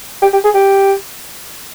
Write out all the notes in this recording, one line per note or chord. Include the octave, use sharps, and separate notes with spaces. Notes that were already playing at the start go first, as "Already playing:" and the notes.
G4
G4
G#4
G4